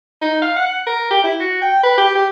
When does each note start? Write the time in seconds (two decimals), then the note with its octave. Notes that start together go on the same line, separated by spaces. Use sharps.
0.21 D#4
0.42 F5
0.56 F#5
0.86 A#4
1.10 G4
1.24 E4
1.40 F#4
1.62 G5
1.83 B4
1.97 G4
2.15 G4